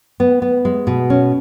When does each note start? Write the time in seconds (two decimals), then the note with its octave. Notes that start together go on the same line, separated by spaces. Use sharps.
0.20 B3
0.42 B3
0.65 G#3
0.87 B2
1.10 C#4